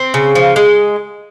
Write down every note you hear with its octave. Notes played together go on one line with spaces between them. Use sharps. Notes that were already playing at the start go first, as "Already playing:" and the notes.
Already playing: C4
C#3
F3
G#3